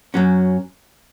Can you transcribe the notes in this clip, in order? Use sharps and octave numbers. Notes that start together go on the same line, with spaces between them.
F#2 F#3 C#4